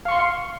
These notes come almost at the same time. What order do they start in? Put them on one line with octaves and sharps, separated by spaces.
F5 C#6 C6